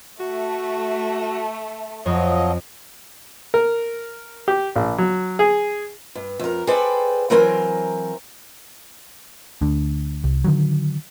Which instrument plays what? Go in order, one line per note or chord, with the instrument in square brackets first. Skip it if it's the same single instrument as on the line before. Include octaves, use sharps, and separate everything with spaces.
[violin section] A3 [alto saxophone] F#4
[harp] F2 [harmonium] F3 F#3 D#5 [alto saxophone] C#5
[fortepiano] A#4
G4
A#1
F#3
G#4
[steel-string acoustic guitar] G2
F2 A#4
G#4 A4 B4 C5 D5 G5
E3 F#3 C4 A#4 C5 G#5
[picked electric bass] D2 D3
C2
D3 D#3 F#3